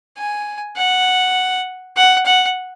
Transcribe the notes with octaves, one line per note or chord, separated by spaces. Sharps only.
G#5
F#5
F#5
F#5